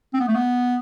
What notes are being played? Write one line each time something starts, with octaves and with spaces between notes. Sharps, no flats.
C4
B3
A3
B3